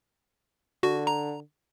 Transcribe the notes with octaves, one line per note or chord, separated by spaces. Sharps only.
D3 F#4
A#5